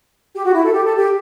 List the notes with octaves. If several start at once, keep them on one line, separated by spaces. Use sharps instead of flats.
G4
F#4
E4
A4
G4
A4
G4